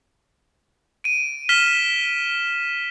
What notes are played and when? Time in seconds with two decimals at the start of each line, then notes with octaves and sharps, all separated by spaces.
1.04 D7 D#7
1.49 F6 B6 E7 G7